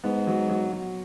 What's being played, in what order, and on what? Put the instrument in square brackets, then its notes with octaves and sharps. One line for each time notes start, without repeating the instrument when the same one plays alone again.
[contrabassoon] G#2 [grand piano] B3
[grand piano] F#3
F#3
F#3